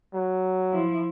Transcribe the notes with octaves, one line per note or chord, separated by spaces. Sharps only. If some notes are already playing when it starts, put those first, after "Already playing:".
F#3
F3 E4